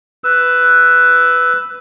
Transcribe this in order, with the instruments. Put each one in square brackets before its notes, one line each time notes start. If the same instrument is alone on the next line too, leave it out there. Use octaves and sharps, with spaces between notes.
[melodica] B4 E6